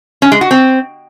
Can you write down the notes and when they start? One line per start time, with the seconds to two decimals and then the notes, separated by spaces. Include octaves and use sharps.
0.22 C#4
0.32 G#3
0.41 F#4
0.51 C4